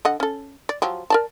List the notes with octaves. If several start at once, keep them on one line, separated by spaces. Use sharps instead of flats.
D3 D#5 F#5
C#4 A4
D5
F3 F#3 G4
A#4 D5 A5